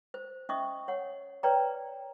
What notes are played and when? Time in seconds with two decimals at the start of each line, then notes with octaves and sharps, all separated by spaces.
0.14 C5
0.49 C#4 D#5 E5 C#6 D#6
0.88 C#5 F#5
1.43 B4 C#5 D5 G5 A#5